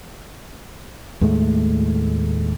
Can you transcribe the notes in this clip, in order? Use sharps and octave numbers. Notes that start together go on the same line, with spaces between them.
D#2 A2 G#3 A3